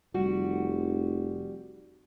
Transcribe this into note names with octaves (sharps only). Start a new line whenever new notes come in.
F1 G3 F#4